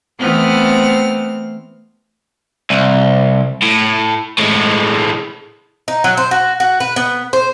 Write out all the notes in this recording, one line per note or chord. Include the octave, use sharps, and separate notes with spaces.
E3 A3 B3 C4 F6
C2
A2
A2 G#3
D#4
F#3
C5
F#4
F#4
B4
B3
C5